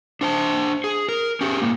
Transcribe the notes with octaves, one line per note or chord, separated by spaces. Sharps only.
D4 C5 A5
G#4
A#4
C#4 G4 G#4
A2 A#3